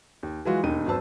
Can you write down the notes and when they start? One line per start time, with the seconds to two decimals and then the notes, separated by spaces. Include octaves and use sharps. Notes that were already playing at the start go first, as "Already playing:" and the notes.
0.23 D#2
0.45 E3 F#3 G#3 F4 F#4
0.63 E1 D#2 D#4 D#7
0.86 G#1 F#3 B4 C5 A5 E6